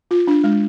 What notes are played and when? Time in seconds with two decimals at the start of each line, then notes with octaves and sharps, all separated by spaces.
0.11 F4
0.27 D4
0.44 G#3